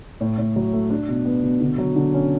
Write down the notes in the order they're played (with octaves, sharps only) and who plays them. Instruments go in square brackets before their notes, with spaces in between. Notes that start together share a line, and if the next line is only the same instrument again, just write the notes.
[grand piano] A2
A2
F#3
A3
D4
B2
B3
B2
D3
F#3
D3
C#4